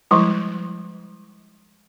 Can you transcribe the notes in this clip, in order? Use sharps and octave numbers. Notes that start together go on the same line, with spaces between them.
F3 G3 G#3 E4